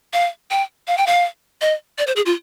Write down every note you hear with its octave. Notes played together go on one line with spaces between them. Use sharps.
F5
G5
F5
G5
F5
D#5
D5
C5
G#4
F4